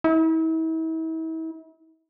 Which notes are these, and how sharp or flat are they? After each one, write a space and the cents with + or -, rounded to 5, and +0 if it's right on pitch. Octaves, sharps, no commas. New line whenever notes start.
E4 -40